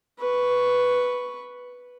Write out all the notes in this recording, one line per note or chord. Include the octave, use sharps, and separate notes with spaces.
B4 C#6